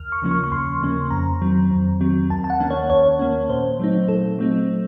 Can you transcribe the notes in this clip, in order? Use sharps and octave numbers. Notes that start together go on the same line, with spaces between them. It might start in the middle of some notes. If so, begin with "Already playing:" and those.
Already playing: D#2 F6
C#6
C#3 F3 A#3 C#4
C#6
C#6
D#2 C6
C#3 F3 A#3 C#4
F2 A#5
D#3 F#3 C4
F2
D#3 F#3 C4
D#2 A5
A5
F#5
D#3 A#3 C#4
C#5
D#2 C#5
D#3 A#3 C#4
A#2 C5
F#3 A3 C4 D#4
A#2 A4
F#3 A3 C4 D#4